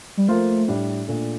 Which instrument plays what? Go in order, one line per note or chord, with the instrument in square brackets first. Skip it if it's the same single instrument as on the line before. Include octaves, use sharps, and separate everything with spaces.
[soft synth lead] G3
[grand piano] F3 A#3 F4 C5 [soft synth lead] A3
[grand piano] A2 G3 D4
A#2 A3 D4